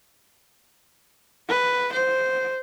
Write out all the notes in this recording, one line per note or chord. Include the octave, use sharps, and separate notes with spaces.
B4
C5